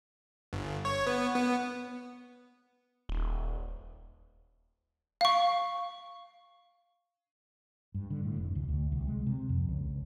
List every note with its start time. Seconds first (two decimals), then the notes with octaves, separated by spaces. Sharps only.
0.53 G1
0.85 C#5
1.07 B3
1.35 B3
3.09 D#1
5.21 F5 C#6
7.94 G2
8.10 D3
8.25 A2
8.36 F1
8.55 D2
8.69 D2
8.92 C2
9.08 G#3
9.26 C3
9.49 F2
9.69 C#2
9.90 C#2